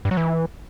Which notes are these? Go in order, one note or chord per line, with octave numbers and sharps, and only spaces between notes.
G2
F#3
E3